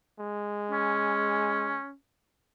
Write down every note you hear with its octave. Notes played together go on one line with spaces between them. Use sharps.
G#3
C#4